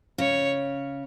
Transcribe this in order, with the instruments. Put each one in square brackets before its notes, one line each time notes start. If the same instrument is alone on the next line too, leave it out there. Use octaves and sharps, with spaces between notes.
[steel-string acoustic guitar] C#3 [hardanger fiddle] C#5